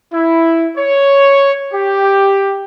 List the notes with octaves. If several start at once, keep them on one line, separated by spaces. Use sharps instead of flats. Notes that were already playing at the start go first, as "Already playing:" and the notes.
E4
C#5
G4